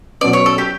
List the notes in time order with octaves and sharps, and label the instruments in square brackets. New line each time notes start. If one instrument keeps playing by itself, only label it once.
[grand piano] B2 F#3 C#4 [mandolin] D5
[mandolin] C#5
A4
G4